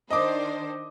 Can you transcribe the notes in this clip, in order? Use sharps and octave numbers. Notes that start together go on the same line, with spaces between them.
D#3 D4 C5 D#5 D6